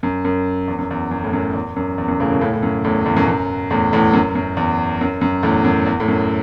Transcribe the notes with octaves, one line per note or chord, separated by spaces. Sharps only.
F#2
F#2
E2
F#2
E2
F#2
A2
F#2
E2
F#2
E2
F#2
A2 C#3
F#2 B2
A2 C#3
A2
F#2
E2 A2
E2 A2
F#2 B2
F#2
E2 A2
E2 A2
F#2
F#2
E2
F#2
F#2
E2 A2
F#2
E2
A2
F#2